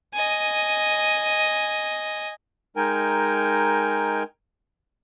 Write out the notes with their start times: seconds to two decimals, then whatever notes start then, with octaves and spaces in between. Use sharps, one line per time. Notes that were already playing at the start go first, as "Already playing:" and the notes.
0.14 D#5 G#5
2.76 G#3 D#4 A#4 G5 G#5